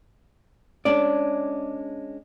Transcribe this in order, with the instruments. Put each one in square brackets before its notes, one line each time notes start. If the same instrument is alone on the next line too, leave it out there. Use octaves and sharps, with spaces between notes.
[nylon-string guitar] G#3 C#4 D4 [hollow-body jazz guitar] D5